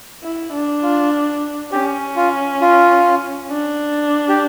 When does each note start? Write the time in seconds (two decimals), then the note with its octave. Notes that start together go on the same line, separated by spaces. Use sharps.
0.23 E4
0.53 D4
0.83 F4
1.72 C#4 G4
2.16 F4
2.61 F4
3.50 D4
4.29 G4